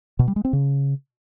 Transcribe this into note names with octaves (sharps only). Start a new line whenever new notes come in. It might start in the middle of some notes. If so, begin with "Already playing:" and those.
B2
G3
G#3
C4
C#3